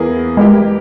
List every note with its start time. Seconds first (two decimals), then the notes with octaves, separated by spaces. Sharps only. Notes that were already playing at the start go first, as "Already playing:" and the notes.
Already playing: E2 E3 A#3 E4 G#4
0.37 E3 G#3 A#3 E4 G4